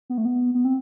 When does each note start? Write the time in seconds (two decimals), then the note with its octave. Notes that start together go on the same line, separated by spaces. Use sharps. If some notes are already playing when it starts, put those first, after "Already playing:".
0.10 B3
0.18 A3
0.25 B3
0.55 B3
0.65 C4